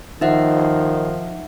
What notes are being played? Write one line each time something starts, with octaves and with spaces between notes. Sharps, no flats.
D#3 F3 D#4 E5 F#5